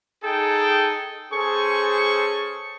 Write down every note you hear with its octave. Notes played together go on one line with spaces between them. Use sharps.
D#4 G#4 A4 G5
C#4 G#4 A4 C5 C#6